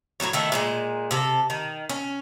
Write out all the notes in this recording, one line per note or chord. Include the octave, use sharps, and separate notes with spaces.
A2 C#3 F#3 C#5
D#3 A3 E4
A#2 F#3 G#3
C3 A4
D#3
C#4